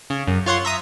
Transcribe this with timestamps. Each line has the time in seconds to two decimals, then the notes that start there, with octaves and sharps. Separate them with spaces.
0.10 C#3
0.27 F#2
0.46 F4 C#5 F#5 C6
0.65 E5 A#5 D#6